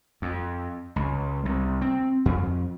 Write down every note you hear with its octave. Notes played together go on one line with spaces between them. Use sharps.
F2
C#2
C2
C4
F2